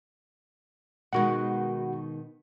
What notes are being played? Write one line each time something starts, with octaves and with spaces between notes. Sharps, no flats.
B2 D#3 G#3 F#4 F#5